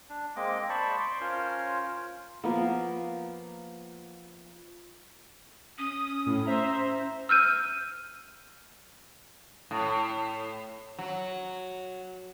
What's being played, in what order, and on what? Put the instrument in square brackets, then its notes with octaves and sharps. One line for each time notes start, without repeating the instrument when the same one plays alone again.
[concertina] D4
G#3 A#3 C4 D#5 D6
C5 D5 A5 B5 C#6
C6 D6
C#4 F4 A#4 C5 C#5
[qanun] F3 A#3 B3
[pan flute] C#4 [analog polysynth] D#6
[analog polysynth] A2
C5 E5 A#5
[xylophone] E6 F6 G6 D#7
[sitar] A2
F#3